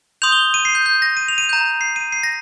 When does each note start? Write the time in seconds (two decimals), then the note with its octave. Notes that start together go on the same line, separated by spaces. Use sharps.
0.22 C6 D#6 G6 F7
0.32 G7
0.54 D#7
0.65 C7
0.75 G6
0.86 G6
1.02 A#6
1.17 D#7
1.28 F7
1.38 D#7
1.49 A#5 G6
1.81 C7
1.96 D#7
2.12 C7
2.23 A#6